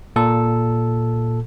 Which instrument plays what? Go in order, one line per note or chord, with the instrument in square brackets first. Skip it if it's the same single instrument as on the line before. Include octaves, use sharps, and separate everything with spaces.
[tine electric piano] A#2 A4